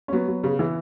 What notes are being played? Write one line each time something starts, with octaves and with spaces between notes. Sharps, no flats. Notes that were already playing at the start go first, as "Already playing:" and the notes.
C#4
F#3 B3
F#3
C#3
E3